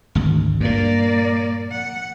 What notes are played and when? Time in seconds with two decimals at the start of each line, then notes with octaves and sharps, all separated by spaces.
0.15 G#1 D2
0.60 G2 A#2 A#3 D5
1.71 F#5